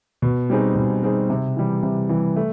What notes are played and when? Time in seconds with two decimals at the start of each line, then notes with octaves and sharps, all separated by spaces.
0.22 B2
0.50 G3 C4 D#4 G#4
0.76 B2
1.03 G3 C4 D#4 G#4
1.30 C3
1.56 E3 G3
1.83 C3
2.09 E3 G3
2.36 A3